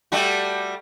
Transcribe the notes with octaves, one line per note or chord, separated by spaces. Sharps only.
G3 A3 F#4